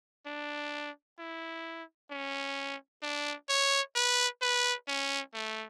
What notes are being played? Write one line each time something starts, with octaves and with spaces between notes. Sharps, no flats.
D4
E4
C#4
D4
C#5
B4
B4
C#4
A3